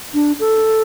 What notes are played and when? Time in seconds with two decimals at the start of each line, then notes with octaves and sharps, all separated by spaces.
0.14 D4
0.40 A4